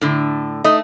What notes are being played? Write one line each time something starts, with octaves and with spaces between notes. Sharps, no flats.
A2 D3
A3 D#4 D#5